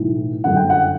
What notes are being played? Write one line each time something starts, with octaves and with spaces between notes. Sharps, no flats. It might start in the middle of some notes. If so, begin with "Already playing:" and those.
Already playing: B1 A2 E3
G1 F#2 D3 F#5
G5
F#5